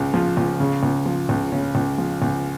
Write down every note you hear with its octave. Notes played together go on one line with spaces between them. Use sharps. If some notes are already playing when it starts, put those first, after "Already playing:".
Already playing: C#2 C#3
F3
C#2
C#3
C#2
F3
C#2
C#3 C#4
C#2
F3
C#2